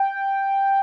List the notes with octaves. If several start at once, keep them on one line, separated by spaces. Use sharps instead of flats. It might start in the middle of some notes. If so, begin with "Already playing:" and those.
Already playing: G5